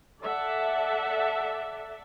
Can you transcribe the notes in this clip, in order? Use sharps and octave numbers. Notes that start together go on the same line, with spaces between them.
A4 D5 E5 F#5 A5